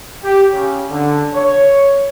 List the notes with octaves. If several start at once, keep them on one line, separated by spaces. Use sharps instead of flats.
G4
C#3
D3
C#5